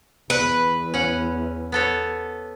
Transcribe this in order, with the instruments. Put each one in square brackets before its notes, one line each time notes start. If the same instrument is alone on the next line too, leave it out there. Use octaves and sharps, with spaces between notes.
[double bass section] E2 [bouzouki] B4
[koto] C#4 F#5
B3 A4 C#5